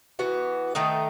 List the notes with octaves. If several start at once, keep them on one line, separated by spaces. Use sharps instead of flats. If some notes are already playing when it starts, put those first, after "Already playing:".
E3 B3 F#4
D#3 A3 D#4